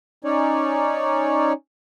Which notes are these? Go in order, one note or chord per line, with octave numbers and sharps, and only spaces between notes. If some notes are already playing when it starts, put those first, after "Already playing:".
C#4 D#4 C#5 D5